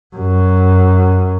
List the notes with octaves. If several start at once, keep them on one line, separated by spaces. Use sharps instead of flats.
F#2